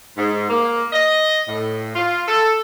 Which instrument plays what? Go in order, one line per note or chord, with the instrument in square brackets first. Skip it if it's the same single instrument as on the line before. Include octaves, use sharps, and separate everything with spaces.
[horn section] G#2
A#3
D#5
A2
F4
A4